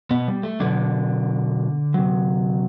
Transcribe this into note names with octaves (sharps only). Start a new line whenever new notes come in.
B2 B3
G3
A3
B2 D3 F#3 D4
C3 F#3